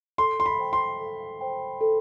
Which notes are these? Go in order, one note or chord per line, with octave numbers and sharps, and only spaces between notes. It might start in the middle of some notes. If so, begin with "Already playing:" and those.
A4 C6
C6
B5
C5 G5
C6
A4
C5 G5
A4